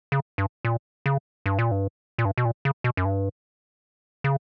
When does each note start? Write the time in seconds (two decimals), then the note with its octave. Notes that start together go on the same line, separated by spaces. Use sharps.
0.12 C#3
0.38 G2
0.65 A#2
1.06 C#3
1.46 G2
1.59 A#2
1.71 G2
2.19 A#2
2.25 G2
2.38 B2
2.45 A#2
2.65 C#3
2.84 B2
2.97 F#2
3.05 G2
4.24 C#3